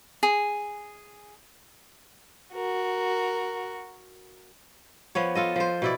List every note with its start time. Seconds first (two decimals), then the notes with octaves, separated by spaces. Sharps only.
0.23 G#4
2.53 F#4 A#4
5.15 F3 B3 C#5
5.35 F4 A4 D#5
5.56 F3 C5
5.82 B2 E4 D5